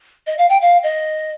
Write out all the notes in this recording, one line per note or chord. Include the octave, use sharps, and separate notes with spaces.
D#5
F5
G5
F5
D#5